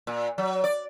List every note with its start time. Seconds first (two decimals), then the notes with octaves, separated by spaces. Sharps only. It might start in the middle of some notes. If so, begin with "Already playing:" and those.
0.07 A#2
0.38 F#3
0.64 D5